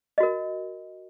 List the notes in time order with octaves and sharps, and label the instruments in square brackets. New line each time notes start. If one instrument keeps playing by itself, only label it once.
[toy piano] D#5
F#4
A#4